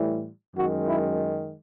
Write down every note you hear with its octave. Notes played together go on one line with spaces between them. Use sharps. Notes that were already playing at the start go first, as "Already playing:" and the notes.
Already playing: A2 E3 G3
F#2 D#3 G#3 F#4
E4